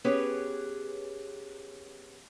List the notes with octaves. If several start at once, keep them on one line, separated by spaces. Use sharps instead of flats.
B3 C#4 G4 G#4 B4 C#5